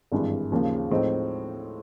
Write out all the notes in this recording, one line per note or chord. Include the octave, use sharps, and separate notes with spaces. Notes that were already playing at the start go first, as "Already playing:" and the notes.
G#1 G2 E3 G#3
D#2 C#3 F3 A#3
A2 F3 G#3 C4 D#4